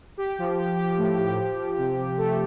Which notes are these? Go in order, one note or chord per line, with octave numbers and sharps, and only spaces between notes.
G4
F3
G4
G4
A2
G4
F3
F3
C3
C3
A3